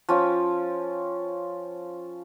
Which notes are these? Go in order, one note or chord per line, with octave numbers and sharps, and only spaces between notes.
F3 C#4 G5